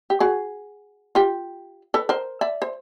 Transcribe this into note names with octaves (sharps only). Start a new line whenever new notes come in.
G4
F#4 G#4
F4 G4
A4 B4
A#4 C5
D5 E5
C5